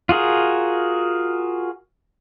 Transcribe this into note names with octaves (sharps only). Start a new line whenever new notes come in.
F4 F#4 G#4 A#4